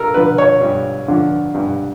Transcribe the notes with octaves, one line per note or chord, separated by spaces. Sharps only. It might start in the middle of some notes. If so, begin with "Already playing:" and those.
Already playing: G2 A4 A#4
D3 F3 B4
C#5
G2
D3 F3
G2